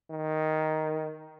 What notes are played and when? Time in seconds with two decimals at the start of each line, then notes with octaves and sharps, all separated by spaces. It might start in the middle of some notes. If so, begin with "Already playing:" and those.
0.11 D#3